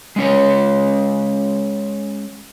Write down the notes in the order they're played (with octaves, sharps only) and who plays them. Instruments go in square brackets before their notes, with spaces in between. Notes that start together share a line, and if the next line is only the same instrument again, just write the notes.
[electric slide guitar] G#3 C#4 C#5